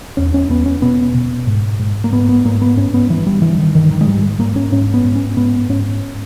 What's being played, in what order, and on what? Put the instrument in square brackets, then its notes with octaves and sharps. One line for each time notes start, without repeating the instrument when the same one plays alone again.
[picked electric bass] E2 C#4
C#4
E2 B3
C#4
B2 B3
B2
G#2
G#2
A#3
G#2 B3
B3
G#2 A#3
B3
G2 C#4
B3
G2 E3
G3
G2 E3
D#3
G2 D#3
D#3
G#3
G#2 G3
G#2 A#3
C#4
G#2 C#4
B3
G#2
C#4
G#2 B3
G#2 C#4